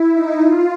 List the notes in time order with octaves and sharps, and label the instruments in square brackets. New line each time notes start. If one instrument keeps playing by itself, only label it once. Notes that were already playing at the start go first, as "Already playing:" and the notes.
Already playing: [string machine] E4
D#4
F4